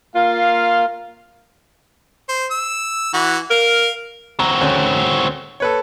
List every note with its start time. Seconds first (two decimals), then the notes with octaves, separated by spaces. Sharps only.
0.15 A#3 F4 F5
2.29 C5
2.51 E6
3.13 E3 F#4
3.50 A#4 F5
4.39 C4 F#4 A#5
4.61 D2 C#4
5.60 A4 B4 C#5